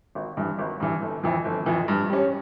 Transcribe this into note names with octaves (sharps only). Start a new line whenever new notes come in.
G#1
G2 E3
G#1
G2 E3
G1
F2 E3
G1
F2 E3
G2
G3 C#4